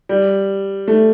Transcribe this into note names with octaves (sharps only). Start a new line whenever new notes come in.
G3
A3